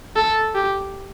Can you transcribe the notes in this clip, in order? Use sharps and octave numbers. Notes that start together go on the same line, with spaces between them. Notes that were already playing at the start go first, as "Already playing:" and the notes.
A4
G4